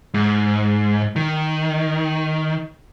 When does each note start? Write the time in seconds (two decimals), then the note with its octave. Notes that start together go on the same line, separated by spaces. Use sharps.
0.14 G#2
1.16 D#3